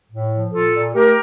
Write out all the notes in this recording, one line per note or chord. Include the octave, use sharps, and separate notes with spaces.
A2
F3
A#2 F4 A4
A#2
A3 G4 A#4